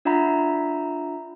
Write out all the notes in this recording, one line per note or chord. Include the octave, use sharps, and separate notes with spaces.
D4 F4 E5 F#5 A#5 B5